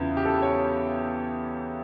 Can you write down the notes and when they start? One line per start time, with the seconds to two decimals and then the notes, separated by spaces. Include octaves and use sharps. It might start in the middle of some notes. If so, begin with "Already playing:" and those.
Already playing: E2 C#3 E3 F4
0.17 G4
0.26 A4
0.42 C#5